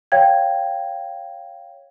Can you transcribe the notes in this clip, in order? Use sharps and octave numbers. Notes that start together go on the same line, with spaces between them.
C#5 F5 G5 G#6